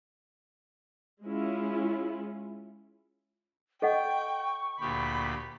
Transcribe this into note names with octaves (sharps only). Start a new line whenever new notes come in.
G#3 C#4 E4 F4
A4 D#5 F#5 G5 C#6
D2 A#2 G4 B5